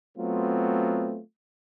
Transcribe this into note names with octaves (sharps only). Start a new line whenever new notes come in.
F#3 A3 B3 C4 F4